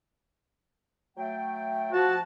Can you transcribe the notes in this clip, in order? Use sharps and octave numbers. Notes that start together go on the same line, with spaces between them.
F#3 A3 G5
F3 F#4 A5